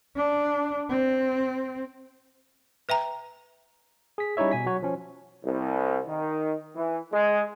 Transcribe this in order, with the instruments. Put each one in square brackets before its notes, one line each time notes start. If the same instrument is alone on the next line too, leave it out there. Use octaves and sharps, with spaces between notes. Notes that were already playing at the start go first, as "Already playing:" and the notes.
[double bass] D4
C4
[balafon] B4 E5 G5 A#5
[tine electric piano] G#4 B6
G3 C#4 D#4 E4 C#5 E5
B2 G#5 B6
F#3 F#4 C#5
F3 C#4
[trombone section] C2
D#3
E3
G#3